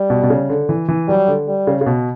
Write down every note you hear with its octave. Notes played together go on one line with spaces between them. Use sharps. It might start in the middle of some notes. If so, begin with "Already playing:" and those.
Already playing: G3
B2
B2
C#3
D3
E3
E3
F#3 G3
D3
G3
C#3
C#3
B2